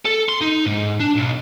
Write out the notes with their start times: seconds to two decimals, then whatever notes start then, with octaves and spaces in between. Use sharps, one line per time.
0.05 A4
0.29 C6
0.41 D#4
0.66 G#2
1.00 D4
1.16 B1